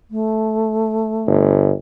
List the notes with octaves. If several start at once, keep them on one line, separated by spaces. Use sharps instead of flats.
A3
G1